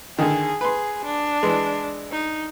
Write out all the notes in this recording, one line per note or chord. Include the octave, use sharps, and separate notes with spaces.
D3 D#3 G#4
G#4 B4 C6
D4
E3 G#3
D#4